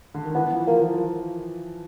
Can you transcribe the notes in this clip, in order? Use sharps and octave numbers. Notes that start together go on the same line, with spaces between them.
D3
D#3
E3 B3
F3
F3 A#3
F3